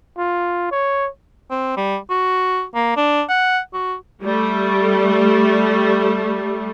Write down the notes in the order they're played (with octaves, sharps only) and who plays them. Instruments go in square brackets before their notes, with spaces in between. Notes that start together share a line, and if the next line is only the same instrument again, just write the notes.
[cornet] F4
C#5
[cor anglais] C4
G3
F#4
A#3
D4
F#5
F#4
[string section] G3 A3